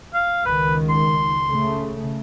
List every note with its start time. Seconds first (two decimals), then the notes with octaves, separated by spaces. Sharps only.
0.14 F5
0.45 C#2 D#3 B4
0.90 C6
1.48 C#3 A3